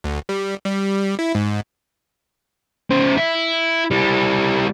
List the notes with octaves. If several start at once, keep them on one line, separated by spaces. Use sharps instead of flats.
D2
G3
G3
E4
G#2
C#3 C5
E4
G3 E4